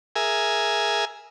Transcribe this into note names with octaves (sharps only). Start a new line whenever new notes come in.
G#4 A#4 E5 G#5